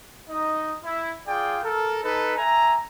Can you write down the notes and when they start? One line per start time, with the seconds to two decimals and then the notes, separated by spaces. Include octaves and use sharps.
0.30 D#4 D#5
0.85 E4
1.27 F4 G#4 D5 G5
1.64 A4 A#4
2.04 D#4 A4 B4
2.37 E5 G#5 A#5